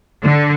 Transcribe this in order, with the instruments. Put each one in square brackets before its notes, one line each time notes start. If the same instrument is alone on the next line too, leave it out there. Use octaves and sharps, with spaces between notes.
[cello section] D3